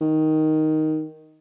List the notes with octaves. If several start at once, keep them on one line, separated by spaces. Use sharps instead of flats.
D#3